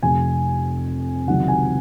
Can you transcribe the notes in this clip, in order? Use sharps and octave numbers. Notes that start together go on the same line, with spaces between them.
F1 F2 C3 G#5
C#2 C3 D#3 F#3 F#5
G#5